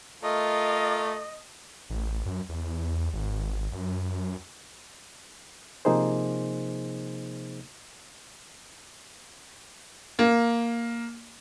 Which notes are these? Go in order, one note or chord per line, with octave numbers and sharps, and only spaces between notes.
A3 F4 A#4 D#5
A1
F#2
E2
G#1
F#2
C3 F3 A#3 D#4 G#4 C5
A#3